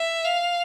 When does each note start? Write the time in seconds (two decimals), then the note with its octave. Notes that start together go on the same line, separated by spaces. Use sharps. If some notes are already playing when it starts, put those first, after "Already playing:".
Already playing: E5
0.25 F5